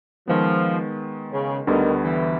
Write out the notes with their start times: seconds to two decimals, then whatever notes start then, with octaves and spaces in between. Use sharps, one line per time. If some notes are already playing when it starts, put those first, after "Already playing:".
0.28 D#3 F3 G#3 B3
1.33 C#3
1.67 D2 D3 D#3 G3 B3
2.02 E3